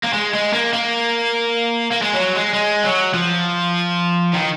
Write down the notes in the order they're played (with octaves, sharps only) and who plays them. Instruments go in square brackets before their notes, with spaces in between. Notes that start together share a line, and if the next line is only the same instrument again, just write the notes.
[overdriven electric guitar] A#3
G#3
G#3
A#3
A#3
A#3
G#3
F#3
G#3
G#3
F#3
F3
D#3